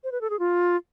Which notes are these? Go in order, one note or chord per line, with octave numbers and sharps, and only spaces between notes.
C5
B4
A4
G#4
F4